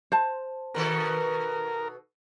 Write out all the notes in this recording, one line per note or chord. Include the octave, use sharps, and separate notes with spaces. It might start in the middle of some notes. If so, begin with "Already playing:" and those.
C5 A5
B2 D#3 A4 A#4